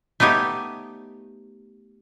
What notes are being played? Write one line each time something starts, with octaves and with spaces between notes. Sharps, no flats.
A3 B3 D#4 G4 C#5